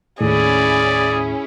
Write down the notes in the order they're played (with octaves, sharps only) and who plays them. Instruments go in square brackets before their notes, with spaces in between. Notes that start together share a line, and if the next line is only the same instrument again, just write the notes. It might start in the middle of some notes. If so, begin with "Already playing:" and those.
[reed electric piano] D#2 A2 [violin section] C#4 E4 [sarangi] G#4 [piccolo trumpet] D5